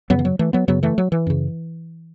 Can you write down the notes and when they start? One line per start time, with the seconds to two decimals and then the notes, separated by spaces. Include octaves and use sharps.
0.10 F#2 C#3 F#3 B3
0.19 E3
0.25 F#3
0.39 E3 A3
0.53 F#3 B3
0.68 F#2 C#3 F#3 B3
0.83 E3 A3
0.98 F#3
1.12 E3
1.27 F#2 C#3